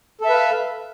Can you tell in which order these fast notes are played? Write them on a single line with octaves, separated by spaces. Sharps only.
A4 E5 B4 F5